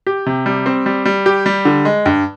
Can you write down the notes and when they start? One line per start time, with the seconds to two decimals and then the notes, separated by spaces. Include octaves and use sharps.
0.07 G4
0.26 C3
0.46 G3
0.66 C4
0.86 G3
1.05 G3
1.26 G4
1.46 G3
1.65 D3
1.85 G#3
2.06 G2